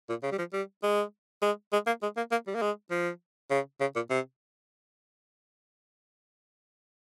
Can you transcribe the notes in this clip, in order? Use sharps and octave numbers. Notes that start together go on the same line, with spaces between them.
A#2
C#3
G3
F3
G3
G#3
G#3
G#3
A#3
G#3
A#3
A#3
G3
A#3
G#3
F3
C#3
C#3
A#2
C3